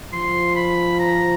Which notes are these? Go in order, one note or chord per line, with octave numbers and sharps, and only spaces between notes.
F3 C6
B5
A#5